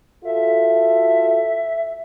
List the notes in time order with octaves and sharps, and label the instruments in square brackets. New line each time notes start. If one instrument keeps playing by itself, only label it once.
[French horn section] F4 F#4 A4 [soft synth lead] E5